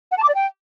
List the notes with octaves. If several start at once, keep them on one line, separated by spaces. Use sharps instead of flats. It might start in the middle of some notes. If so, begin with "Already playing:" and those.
F#5
A5
D6
D5
G5